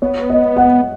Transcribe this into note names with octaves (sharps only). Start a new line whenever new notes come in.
B3 C#5
D#5
F#5